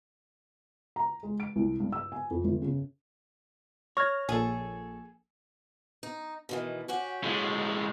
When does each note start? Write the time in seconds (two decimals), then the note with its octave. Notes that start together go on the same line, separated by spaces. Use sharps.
0.96 A#5
1.23 G#3
1.40 D7
1.56 C2
1.80 G2
1.92 E6
2.12 G#5
2.30 F2
2.44 G1
2.62 C#3
3.97 C#5 C#6 F6 G#6 A#6
4.29 A#1 G#4 A4
6.03 D#4
6.49 B2 D#3 E3
6.88 C#4 F#4 G4
7.24 A2 G#3